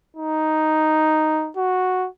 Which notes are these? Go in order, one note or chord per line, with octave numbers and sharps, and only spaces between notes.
D#4
F#4